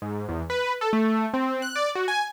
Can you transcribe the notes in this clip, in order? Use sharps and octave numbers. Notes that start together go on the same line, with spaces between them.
G#2
E2
B4
A4
A3
C4
F#6
D5
F#4
G#5